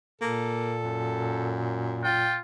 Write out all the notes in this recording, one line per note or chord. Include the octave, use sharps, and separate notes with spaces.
A#2 A#3 A4
F#2
F4 G5